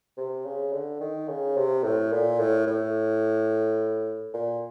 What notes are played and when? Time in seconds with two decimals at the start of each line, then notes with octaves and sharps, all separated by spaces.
0.17 C3
0.46 C#3
0.73 D3
1.00 D#3
1.28 C#3
1.57 C3
1.84 A2
2.12 A#2
2.40 A2
2.67 A2
4.34 A#2